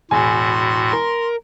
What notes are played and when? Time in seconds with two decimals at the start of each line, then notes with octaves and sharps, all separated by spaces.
0.11 E1 A2 F#4 G#5 C6
0.93 A#4